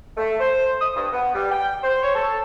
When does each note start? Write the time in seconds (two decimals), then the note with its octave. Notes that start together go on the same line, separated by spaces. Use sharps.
0.17 A3
0.40 C5
0.81 D#6
0.95 G2
1.12 B3
1.35 G3
1.51 G5
1.83 C5
2.03 C#5
2.15 A4